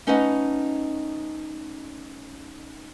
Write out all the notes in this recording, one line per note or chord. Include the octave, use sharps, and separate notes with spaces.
A3 C#4 D#4 B4 D#5 F#5